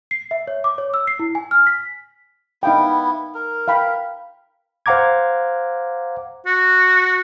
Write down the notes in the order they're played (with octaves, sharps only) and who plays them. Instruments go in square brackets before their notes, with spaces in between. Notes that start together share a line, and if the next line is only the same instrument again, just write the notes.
[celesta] C7
E5
C#5
D6
C#5
E6
C7
E4
G#5
F6
B6
[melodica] B3 E4 [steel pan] D#4 F5 G5
[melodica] A#4
[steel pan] F5 G5 B5
[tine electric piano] C5 F5 F#5 A#5 D6 G#6
[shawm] F#4